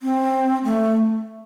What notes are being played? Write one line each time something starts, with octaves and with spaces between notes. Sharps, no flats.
C4
A3